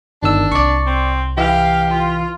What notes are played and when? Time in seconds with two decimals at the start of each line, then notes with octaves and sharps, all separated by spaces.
0.23 G1 D#3 D4 E6
0.52 C2 D5 C#6
0.87 C4
1.38 E3 G4 F5
1.90 F4